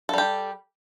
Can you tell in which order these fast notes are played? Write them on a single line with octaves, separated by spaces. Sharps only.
A4 G3 G4